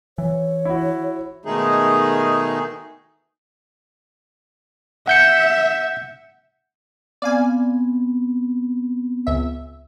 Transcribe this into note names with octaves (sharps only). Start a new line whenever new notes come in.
E3 C#5
E4 F#4
B2 D#3 G#3 A3 D#4 G#4
E5 F#5 G6 C#7
B3 C4 D5 F5 G#5
C#2 E5